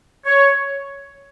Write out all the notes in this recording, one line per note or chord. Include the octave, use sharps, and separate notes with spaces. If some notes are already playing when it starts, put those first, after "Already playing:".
C#5